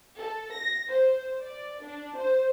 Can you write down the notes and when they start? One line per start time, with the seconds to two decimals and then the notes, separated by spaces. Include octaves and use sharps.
0.19 A4
0.53 A#6
0.88 C5
1.42 D5
1.83 D4
2.16 C5